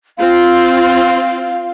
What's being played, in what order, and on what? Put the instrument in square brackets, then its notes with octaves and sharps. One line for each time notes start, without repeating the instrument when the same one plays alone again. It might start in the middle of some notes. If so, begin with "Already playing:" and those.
[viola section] C4 F4 [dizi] F5